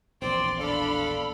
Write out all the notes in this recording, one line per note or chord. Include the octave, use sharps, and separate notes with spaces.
E1 A#1 E2 C4 D5 C6
D4 A4 F5 B5